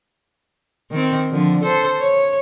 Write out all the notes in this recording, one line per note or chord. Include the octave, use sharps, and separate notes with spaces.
D#3 C4
D3 F3
A4 C5
C#5